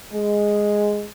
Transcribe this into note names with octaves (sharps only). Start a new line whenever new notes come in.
G#3